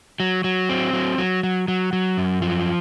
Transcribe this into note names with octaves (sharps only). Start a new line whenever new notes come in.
F#3
F#3
C4
F#3
F#3
F#3
F#3
F#3
F#2
F3